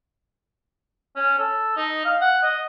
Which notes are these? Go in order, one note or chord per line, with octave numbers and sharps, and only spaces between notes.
C#4
A4
D#4
F5
F#5
D#5